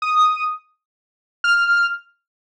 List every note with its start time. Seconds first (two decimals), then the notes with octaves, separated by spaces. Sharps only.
0.02 D#6
1.44 F6